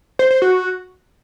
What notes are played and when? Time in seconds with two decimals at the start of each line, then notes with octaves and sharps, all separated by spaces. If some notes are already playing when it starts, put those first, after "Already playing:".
0.19 C5
0.31 C5
0.42 F#4